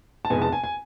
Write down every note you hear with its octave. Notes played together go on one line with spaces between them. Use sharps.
A5
F1 E2 B2 G#3 B3 G#5
A5
G#5
G#5